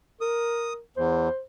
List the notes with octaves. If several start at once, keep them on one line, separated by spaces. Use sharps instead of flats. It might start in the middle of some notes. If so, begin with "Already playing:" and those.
A#4 D#6
E2 C5